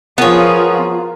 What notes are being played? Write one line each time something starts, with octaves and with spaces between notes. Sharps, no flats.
F3 B3 F4 G#4 A#4 C#5